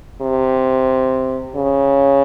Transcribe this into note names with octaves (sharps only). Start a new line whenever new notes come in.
C3
C#3